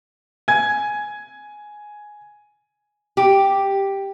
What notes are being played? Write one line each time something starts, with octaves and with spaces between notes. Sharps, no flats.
G#5 G#6
G4